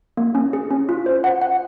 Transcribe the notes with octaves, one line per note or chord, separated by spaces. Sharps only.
A#3
C#4
G#4
C#4
F4
C5
F#5
F#5